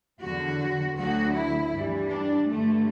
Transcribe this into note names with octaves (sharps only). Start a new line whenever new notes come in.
E2 D3 F#3 F#4
D2 D3 F#3 F#4
E4
G2 E3 G3
D4
G2 D3 G3 A3